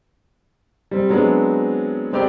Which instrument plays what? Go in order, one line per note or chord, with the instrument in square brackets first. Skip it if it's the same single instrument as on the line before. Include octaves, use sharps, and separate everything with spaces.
[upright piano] G3 C4
F#3 G#3 B3 C4 D4
G#3 C4 G4 G#4 D5